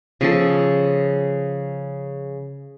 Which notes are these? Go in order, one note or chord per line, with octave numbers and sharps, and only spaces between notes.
C#3 F3 A4